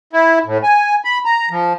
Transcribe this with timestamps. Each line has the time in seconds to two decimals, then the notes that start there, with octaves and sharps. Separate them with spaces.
0.13 E4
0.46 A2
0.63 G#5
1.04 B5
1.25 A#5
1.50 F3